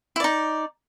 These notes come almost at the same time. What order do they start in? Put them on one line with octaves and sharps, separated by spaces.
E4 D5 D#4